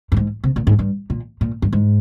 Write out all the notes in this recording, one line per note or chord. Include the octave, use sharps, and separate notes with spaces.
G2
G#2
C3
A#2
G#2
G2
A#2
A#2
G2
G#2